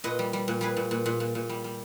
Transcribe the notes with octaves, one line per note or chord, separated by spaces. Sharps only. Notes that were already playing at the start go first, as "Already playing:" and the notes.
A#2 B4 D#5
G3
G3
A#2
G3 G#4 B4
A#2
A#2
A#2
A#2
A#2
G3
G3